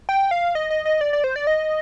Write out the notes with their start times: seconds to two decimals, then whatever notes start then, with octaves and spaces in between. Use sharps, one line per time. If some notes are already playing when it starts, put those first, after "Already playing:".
0.09 G5
0.31 F5
0.55 D#5
0.70 D#5
0.85 D#5
1.01 D5
1.13 D5
1.24 C5
1.36 D5
1.47 D#5